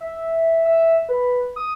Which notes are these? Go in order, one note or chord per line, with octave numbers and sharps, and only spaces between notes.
E5
E5
B4
D#6